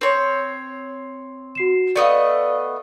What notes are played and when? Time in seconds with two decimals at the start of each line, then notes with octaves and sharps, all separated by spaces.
0.01 C4 C#5
1.55 F#4 C7 E7
1.96 A3 B3 D5 D#5 F5